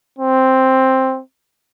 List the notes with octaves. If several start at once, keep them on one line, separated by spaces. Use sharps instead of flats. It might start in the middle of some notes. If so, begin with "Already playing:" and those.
C4